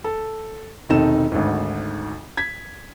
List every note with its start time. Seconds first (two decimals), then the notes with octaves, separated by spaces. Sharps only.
0.04 A4
0.89 E1 C3 D#3 D#4 A4 E7
1.32 G#1 D2 G#2
2.37 G#6 B6